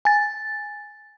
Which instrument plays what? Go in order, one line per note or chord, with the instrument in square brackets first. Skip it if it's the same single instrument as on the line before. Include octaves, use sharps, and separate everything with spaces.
[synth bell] G#5 A6